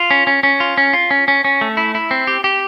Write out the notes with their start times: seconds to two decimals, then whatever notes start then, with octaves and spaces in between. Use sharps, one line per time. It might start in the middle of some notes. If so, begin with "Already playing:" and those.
Already playing: F4
0.11 C#4
0.27 C#4
0.43 C#4
0.60 F4
0.77 C#4
0.93 F4
1.11 C#4
1.28 C#4
1.45 C#4
1.61 A3
1.77 E4
1.95 E4
2.11 C4
2.27 G4
2.44 G4